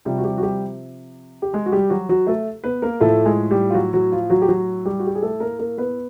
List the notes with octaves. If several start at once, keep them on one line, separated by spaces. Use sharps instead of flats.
C3 F3 G3 G4
F#4
G3 G4
F#4
G3 G4
G4
G#3 G#4
F#4
G3 G4
F#3 F#4
F#3 F#4
A3 A4
B3 B4
A#3 A#4
A2 F3 A3 A4
G#3 G#4
G3 G4
F4
F#3 F#4
F#3 F#4
F3 F4
F#3 F#4
G4
F#3 F#4
G3 G4
F#4
G4
G#4
A3 A4
A#3 A#4
A#3 A#4
B3 B4